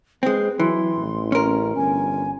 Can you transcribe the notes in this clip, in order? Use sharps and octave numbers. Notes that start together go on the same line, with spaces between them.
G#3 C4 B4
E3 F#3 C6
A1
C#4 A#4
G1 G#5